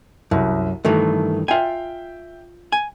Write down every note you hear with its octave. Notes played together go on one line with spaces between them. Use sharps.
C2 F#2
G2 D#3 E3 A3
F4 E5 G5 G#5
G#5